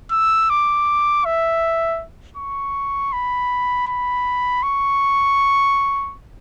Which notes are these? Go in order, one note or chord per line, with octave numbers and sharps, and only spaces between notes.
E6
D6
E5
C#6
B5
B5
C#6